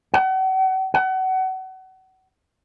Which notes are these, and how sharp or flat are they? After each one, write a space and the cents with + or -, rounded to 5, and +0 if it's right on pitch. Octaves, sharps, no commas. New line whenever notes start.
F#5 +40
F#5 +30